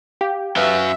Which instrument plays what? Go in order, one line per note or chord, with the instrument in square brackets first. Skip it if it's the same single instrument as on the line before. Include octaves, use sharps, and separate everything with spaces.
[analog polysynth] G4 [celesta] F5
[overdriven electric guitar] F#2 F#3 [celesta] B4 F5 F6 [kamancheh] E5